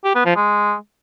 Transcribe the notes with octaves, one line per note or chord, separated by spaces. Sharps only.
G4
B3
F3
G#3